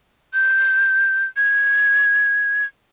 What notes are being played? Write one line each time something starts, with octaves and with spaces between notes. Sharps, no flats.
G6
G#6